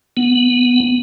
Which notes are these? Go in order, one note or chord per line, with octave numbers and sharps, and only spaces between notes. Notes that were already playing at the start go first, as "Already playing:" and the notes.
B3